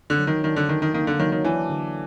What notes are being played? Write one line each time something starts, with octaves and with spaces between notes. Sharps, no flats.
D3
F#3
D#3
D#3 D4
D3
D3 D#3
D#3
D#3 A#3
D3
D#3 F#3
D#3
E3 D4
D3